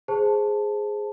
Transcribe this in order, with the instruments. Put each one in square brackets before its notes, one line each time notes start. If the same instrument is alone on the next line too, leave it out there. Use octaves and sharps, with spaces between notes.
[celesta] G#4 C5 A5